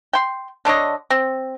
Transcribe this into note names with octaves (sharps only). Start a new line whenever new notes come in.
G5 C6
D3 D4 C#5 D#5
C4